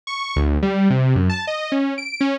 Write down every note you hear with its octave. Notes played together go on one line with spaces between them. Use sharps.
C#6
D2
G3
C3
F#2
A5
D#5
C#4
D7
C#4